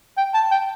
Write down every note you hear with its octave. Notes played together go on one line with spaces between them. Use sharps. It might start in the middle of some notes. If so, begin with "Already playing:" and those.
G5
A5
G5